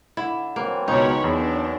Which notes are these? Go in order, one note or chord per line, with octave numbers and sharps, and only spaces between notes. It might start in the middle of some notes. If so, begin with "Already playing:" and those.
D3 E4
E3 F#3 A#3 C4
C#2 B2 D#4 A#4 C#5 B5
E2 D4